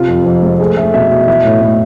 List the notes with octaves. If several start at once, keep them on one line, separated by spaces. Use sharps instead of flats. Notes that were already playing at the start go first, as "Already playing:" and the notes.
Already playing: C3 F4
F2
F2
G#3
A3 G#4
A3 E5
B2 E5
B2 E5
E3 E5
A2
A2